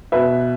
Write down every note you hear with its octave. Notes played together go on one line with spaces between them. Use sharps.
B2 B4 E5